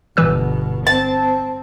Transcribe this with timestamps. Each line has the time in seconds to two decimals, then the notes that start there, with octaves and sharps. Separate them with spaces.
0.17 G1 B2 E3 B4 E6
0.87 C4 A5